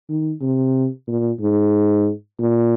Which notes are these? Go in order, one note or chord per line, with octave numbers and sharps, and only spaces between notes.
D#3
C3
A#2
G#2
A#2